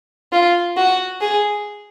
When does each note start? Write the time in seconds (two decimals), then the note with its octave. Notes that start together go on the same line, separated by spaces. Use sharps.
0.32 F4
0.77 F#4
1.20 G#4